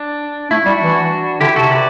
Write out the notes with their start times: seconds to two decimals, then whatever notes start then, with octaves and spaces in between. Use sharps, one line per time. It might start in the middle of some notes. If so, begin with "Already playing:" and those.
Already playing: D4
0.51 A3 E4
0.66 G3 D4 F#4
0.81 E3
1.41 D3 E4 G4
1.56 C3 F#4 A4
1.71 B4 D5